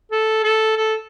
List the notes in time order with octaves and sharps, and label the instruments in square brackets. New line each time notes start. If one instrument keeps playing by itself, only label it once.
[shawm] A4
A4
A4